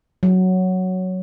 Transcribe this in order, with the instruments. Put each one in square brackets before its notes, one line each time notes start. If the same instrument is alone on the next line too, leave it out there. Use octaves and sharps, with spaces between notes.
[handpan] F#3